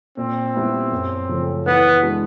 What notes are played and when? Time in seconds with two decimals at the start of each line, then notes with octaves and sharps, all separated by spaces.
0.17 A#2 C4
0.55 G3 B3 E4
0.92 F#2
1.28 C#3 F3 A3
1.66 E3 B3
2.02 G#3 B3 D4 F#4